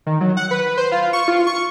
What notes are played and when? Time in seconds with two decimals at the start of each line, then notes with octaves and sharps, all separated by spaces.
0.06 D#3
0.21 F#3
0.37 F#5
0.51 B4
0.77 C5
0.92 F4
1.13 C#6
1.28 F4
1.47 C#6